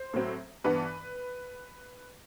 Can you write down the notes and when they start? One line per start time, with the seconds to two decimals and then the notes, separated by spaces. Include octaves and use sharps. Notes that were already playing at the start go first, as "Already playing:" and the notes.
Already playing: C5
0.14 A2 F#3 C4
0.64 G2 E3 B3 B4